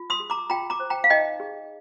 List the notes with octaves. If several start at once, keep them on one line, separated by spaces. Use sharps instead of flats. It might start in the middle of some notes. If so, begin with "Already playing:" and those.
Already playing: F4
C6 D#6
G#4
A#5 D6
F4 G5 A#5
A#5 D6
C5
G5 A#5
F5
D#4 D#5 G5
G#4